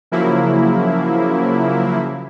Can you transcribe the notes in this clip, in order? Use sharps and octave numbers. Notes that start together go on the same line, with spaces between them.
C#3 F3 F#3 A#3 E4